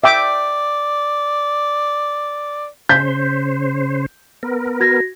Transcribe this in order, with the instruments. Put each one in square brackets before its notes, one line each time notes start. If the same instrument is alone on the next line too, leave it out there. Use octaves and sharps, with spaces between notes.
[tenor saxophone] D5 [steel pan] E5 G5 D6
[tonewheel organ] C#3 C5 [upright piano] G6 B6
[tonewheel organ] B3 A#4
[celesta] F#4 G#6 A#6